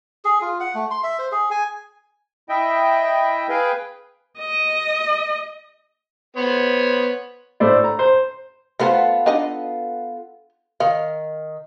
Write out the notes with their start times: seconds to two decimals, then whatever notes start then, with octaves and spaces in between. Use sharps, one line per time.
0.25 G#4
0.42 F4
0.60 F#5
0.75 A3
0.91 C6
1.03 E5
1.19 C5
1.32 G#4
1.51 G#5
2.49 E4 D#5 E5 G5
3.49 G#4 B4 F5 G5 G#5
4.39 D#5
6.37 B3 C5 C#5
7.60 A2 A3 C5 D5
7.84 A#5
7.99 C5
8.80 A3 B3 F4 A4 A#4 C5
9.26 D4 D#4 D#5
10.80 D#3 F5